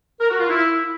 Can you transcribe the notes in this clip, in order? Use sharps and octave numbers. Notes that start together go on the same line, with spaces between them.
A#4
F#4
F4
E4